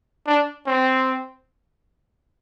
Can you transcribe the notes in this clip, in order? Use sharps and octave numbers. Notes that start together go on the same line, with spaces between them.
D4
C4